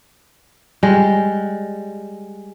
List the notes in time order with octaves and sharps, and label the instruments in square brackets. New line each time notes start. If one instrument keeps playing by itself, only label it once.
[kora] G3 G#3